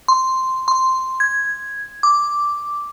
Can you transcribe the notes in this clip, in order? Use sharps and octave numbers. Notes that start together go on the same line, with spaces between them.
C6
C6
G#6
D6